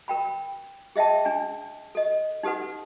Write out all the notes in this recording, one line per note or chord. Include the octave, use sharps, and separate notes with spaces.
A#4 G5 B5
G#4 D#5 E5 G5 A5
D4 G#5
A4 D#5
D#4 G4 A4 B4 F#5